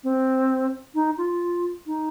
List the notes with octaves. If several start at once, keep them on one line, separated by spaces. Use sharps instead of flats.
C4
D#4
F4
D#4